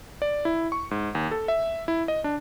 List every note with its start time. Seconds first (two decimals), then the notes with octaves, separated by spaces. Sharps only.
0.22 D5
0.45 E4
0.72 C#6
0.91 G#2
1.15 D#2
1.31 A4
1.48 E5
1.88 E4
2.08 D#5
2.24 D4